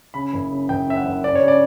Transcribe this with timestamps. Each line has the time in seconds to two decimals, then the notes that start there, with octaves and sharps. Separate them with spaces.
0.14 C#3 B5
0.33 F#1
0.50 C#3
0.69 F#1 G5
0.88 F#2 E5
0.96 F#5
1.05 F#1
1.23 C#3 D5
1.35 C#5
1.42 C#3
1.48 D5